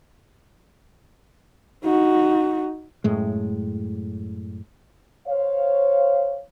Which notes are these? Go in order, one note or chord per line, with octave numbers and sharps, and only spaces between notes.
D#4 F#4
F#2 A2 G#3
C5 C#5 F5